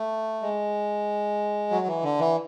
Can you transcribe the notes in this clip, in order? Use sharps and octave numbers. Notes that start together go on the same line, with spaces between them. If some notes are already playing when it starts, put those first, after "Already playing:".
Already playing: A3
G#3
F#3
E3
D3
E3